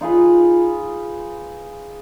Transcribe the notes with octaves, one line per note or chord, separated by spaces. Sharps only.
D#4 F4 G#4 B4